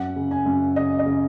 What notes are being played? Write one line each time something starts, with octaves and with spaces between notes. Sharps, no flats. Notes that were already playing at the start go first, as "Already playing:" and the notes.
Already playing: F#2 F#5
C#3
G#5
F#2
C#3 D#5
D#5
C#3